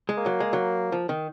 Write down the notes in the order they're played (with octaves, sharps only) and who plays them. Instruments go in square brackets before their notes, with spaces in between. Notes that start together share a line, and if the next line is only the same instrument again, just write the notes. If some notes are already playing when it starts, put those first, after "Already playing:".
[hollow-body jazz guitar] G#3
[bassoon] A#3
[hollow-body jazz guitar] F#3
G#3
F#3
F3
D#3